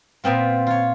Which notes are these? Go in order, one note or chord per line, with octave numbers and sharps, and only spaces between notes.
A#2 B3 C4 F4
F4 C#5